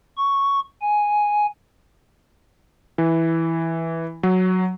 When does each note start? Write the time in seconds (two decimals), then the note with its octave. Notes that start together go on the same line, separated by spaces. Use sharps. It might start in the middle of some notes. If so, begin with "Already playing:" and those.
0.17 C#6
0.81 G#5
2.98 E3
4.23 F#3